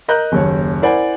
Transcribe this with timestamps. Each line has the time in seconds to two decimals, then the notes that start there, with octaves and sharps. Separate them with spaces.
0.08 A#4 D#5 A#5 F#6 G6
0.32 F#1 D#2 C#5
0.82 E4 A#4 C5 D5 F#5 G#5